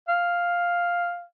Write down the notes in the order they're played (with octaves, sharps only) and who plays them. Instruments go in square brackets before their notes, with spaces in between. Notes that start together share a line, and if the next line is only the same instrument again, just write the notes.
[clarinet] F5